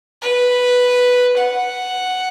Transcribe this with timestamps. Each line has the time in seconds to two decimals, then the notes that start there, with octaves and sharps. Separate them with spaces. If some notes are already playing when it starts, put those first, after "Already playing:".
0.22 B4
1.38 F#5